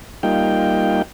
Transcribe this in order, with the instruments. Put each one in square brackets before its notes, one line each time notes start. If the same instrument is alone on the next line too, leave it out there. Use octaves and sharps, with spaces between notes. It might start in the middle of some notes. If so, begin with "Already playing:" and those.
[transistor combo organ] G3 A#3 D#4 F4 G5